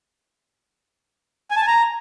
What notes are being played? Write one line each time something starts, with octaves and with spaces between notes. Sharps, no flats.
G#5
A5
G#5
A#5